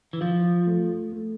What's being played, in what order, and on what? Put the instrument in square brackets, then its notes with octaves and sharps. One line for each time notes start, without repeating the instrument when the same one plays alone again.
[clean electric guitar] E3
[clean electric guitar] F3 [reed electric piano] F4
[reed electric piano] A3
A3